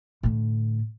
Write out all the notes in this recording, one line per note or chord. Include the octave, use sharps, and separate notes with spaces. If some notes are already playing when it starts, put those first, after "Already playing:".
A2 D3